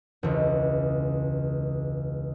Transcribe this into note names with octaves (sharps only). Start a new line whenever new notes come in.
E1 C#2